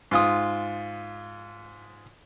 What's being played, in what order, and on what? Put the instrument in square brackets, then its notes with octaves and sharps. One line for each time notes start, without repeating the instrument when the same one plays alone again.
[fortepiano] G#2 F4 D#6